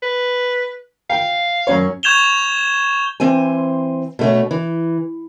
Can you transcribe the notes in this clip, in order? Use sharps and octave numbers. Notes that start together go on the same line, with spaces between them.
B4
F5 G5
F#2 C#4 C#5
C#6 G6 G#6 E7 F7 G7
E3 C4 C5 G#5
B2 A3 C#4
E3